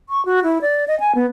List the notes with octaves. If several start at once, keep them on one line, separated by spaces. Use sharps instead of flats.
C#6
F#4
E4
D5
D#5
G#5
B3